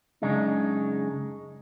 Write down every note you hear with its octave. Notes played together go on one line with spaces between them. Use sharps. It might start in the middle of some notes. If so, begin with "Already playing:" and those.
F#2 C#3 G#3 D4 D#4